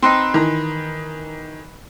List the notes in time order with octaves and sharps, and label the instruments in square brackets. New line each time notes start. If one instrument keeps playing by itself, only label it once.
[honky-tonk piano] C4 [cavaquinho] D#4 B4 C6
[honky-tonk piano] D#3 E3 A#5